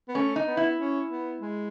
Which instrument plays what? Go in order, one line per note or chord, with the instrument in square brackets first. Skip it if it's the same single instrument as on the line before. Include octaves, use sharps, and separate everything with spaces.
[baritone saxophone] B3
[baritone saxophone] A3 [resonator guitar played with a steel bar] C#4
[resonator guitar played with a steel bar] D#4
[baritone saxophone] B3
[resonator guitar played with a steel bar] E4
[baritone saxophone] C#4
B3
G#3